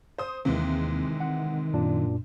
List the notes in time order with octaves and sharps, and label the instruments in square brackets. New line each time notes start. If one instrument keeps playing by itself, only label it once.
[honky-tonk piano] C5 D#6
[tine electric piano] D#2 A#3 [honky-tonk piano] C3 E3 G#3 [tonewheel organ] D#3
[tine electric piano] F#5
F#2 A#2 D4